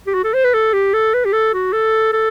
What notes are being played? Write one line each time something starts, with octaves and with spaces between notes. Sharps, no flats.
G4
F#4
A4
C5
B4
A4
G4
A4
B4
G4
A4
F#4
A4
A4